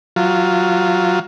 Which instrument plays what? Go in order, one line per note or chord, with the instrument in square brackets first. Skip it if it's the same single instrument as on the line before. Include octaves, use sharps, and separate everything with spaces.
[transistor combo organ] F#3 F4